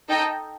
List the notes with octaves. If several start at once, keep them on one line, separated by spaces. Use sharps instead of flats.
D#4 A4 D#5 G5